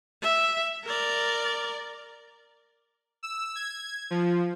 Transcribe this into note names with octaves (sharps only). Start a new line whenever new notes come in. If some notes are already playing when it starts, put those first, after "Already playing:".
E5
A#4 D5
E6
G#6
F3